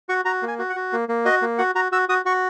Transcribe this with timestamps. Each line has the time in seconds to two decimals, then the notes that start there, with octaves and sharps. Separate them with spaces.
0.09 F#4 C#6
0.25 F#4 A#5
0.42 A#3
0.48 G#5
0.59 F#4
0.70 F#5
0.76 F#4
0.93 A#3
1.09 A#3
1.25 F#4 D#5
1.42 A#3
1.58 F#4 F#5
1.75 F#4 A#5
1.92 F#4 E6
2.09 F#4 D#6
2.25 F#4 C#6